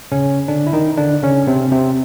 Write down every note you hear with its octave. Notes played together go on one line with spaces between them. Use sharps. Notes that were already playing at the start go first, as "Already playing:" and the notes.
C#3 C#4
D3 D4
E4
D#3 D#4
D3 D4
C#3 C#4
C3 C4
C3 C4